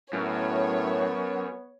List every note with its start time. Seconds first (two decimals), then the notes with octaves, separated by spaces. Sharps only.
0.13 F#2 A2 B3 C#5